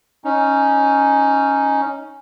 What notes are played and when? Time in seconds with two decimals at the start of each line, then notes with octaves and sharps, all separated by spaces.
0.24 C#4 D#4